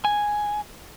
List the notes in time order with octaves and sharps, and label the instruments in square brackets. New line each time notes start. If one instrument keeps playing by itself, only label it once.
[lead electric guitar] G#5